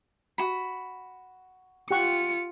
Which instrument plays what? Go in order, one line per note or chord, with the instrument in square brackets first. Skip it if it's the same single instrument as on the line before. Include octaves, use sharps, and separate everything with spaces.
[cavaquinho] F#4 B5
[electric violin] F4 C#7 [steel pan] G4 F#5 C#6